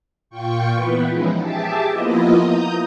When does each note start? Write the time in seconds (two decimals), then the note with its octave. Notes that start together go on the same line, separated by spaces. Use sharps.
0.30 A#2 F4 G5 C#6
0.74 E3 B3 B4
1.09 F3 G#3 C#4 D#4 E4
1.39 G4 G#4 E5 A5 D6
1.90 F3 A#3 B3 E4 F4 D#5
2.38 A#5 D#6 G6